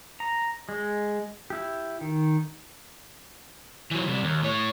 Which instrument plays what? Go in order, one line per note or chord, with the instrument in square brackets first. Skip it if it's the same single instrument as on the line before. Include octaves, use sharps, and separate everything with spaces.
[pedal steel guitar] A#5
G#3
E4 G4
D#3
[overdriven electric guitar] E3 F#3
C3 G3
D#2
A2 C#5